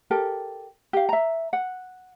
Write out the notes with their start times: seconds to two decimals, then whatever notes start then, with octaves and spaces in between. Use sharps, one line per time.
0.11 G4 A4 A#4
0.93 G4 F5
1.09 E5 A#5
1.53 F#5